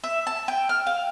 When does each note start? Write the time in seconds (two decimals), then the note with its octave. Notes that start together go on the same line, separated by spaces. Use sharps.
0.04 E5
0.27 A5
0.48 G5
0.69 F6
0.87 F5